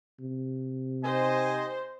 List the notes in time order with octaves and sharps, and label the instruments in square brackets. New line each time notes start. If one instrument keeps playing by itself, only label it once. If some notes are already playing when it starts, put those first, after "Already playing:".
[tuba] C3
[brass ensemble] D#4 G4 D#5 [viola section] C5 [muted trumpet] G#5